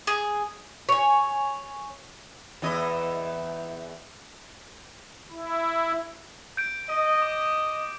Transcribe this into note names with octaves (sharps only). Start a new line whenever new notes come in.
G#4
C#5 G#5
E2 E4 D#5
E4
G6 D7
D#5
D6